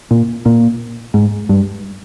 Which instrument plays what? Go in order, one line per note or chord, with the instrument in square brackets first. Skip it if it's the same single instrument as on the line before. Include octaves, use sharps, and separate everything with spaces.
[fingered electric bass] A#2
A#2
G#2
G2